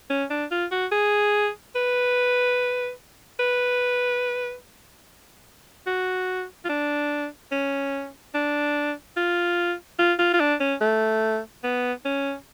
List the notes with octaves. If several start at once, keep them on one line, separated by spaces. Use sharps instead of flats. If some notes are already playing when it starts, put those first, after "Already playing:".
C#4
D4
F4
F#4
G#4
B4
B4
F#4
F4
D4
C#4
D4
F4
F4
F4
F4
D4
C#4
A3
B3
C#4